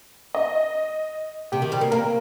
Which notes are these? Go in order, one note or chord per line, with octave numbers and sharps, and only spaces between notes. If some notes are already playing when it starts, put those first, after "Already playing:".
D#5
C3 G4
D#3
G3
A#3
A#3 A#4